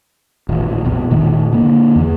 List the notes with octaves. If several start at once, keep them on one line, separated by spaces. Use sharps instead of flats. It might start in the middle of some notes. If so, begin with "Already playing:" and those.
D#1 A1
A#1 E2 B2
E1 A#2 D#3 A3
D3 A#3
E2 E3